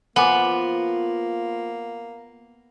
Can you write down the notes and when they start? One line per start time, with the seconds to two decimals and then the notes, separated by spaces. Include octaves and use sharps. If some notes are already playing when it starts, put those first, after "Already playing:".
0.16 F3 A#3 B3 F4 F#5 G#5 D6